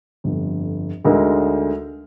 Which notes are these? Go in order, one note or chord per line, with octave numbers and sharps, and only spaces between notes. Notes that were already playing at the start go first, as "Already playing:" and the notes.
G1 F2 D3
D2 D3 G#3 D#4 A#4